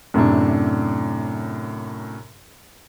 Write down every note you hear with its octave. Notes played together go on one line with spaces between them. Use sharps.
F#2 A2 C3 D4